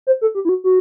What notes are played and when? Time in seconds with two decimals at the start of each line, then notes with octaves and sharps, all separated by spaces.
0.07 C5
0.21 A4
0.35 G4
0.45 E4
0.49 F#4
0.64 F#4